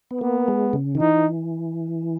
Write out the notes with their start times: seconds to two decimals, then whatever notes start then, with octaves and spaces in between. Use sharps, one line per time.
0.11 B3
0.21 A#3 B3
0.48 G#3
0.73 C#3
0.95 D#3
1.00 E3 D#4